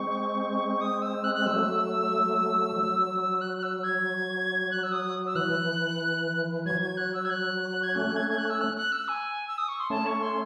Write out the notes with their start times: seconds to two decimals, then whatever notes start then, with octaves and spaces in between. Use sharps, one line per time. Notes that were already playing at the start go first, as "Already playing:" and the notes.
Already playing: G#3 C4 C#6
0.81 D#6
1.02 E6
1.24 F#6
1.35 F#6
1.46 F#3 A3 E6
2.76 F#3
3.41 F#6
3.58 F#6
3.63 E6
3.83 G#6
4.71 F#6
4.83 E6
4.92 D#6
5.27 E6
5.35 E3 F#6
6.65 F#3 G#6
6.81 G#6
6.97 F#6
7.14 E6
7.25 G#6
7.30 F#6
7.83 G#6
7.95 A3 C#4 F#6
8.16 G#6
8.29 G#6
8.38 F#6
8.50 E6
8.61 F#6
8.77 F#6
8.92 E6
9.08 G#5
9.48 E6
9.58 D#6
9.68 C#6
9.80 C6
9.90 A3 C#4 A5
10.06 C#6
10.22 C6